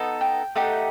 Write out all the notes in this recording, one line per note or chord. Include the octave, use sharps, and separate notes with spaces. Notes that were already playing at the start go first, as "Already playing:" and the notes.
Already playing: B3 D#4 A4
G5
A3 D#4 G4 F#5